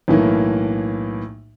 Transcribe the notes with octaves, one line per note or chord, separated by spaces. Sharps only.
B1 A2 E3 A#3